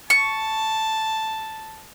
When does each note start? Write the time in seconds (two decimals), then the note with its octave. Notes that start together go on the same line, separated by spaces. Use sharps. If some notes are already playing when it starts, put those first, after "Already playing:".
0.10 A5 C#6